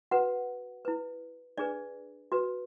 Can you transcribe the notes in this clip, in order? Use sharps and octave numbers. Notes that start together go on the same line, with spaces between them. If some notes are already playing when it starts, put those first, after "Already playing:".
F#4 B4 F#5
E4 B4
D4 G#4 B4 D5
F#4 B4